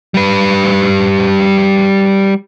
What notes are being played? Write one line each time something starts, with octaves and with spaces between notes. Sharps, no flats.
G3 B4